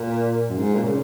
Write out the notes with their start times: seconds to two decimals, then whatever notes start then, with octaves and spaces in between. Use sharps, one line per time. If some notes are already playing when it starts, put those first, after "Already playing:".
Already playing: A#2
0.49 F#2
0.58 G#2
0.74 A#2
0.84 C#3